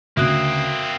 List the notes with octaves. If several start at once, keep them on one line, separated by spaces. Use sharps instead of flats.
D2 C#3 A#3 C4 E5 D#6 F#6